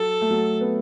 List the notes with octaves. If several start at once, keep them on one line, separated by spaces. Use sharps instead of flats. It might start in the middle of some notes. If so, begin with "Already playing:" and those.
Already playing: F#3 A4
A3
F#3
B3